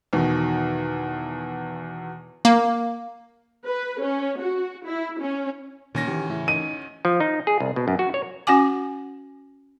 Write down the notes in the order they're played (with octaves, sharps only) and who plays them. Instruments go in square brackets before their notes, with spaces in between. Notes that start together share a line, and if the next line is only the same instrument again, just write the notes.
[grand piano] E2 B2 D#3
[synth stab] A#3
[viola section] B4
C#4
F#4
E4
C#4
[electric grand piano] D2 C#4 A#6 [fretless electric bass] A#2 D#3
[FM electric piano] D#3 G4 [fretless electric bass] E3
[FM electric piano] A2 C#3 E4
[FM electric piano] D#4 [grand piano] D#7
[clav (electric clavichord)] F3
D#4
G#4
C2
B2
F#2
F#4
C#5
[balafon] C#4 F#4 F#5 G#5 D6